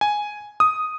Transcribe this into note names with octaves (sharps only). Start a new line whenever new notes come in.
G#5
D#6